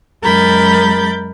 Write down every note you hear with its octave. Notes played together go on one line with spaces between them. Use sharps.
F#2 G#3 A#4 B5 G6 A6